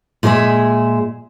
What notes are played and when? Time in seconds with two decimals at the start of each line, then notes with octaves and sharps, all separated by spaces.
0.23 A#2 G#3 G#4 C#5 E5